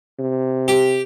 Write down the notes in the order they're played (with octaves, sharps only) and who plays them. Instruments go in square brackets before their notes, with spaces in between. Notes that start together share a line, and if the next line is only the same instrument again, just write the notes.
[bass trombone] C3
[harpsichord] G4